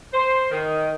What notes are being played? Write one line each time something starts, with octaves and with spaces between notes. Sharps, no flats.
C5
D#3